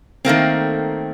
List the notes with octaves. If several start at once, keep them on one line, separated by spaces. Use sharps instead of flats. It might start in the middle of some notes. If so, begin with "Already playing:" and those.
D#3 A3 A#3 C4